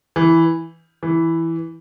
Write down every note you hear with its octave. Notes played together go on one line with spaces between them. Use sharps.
E3
E3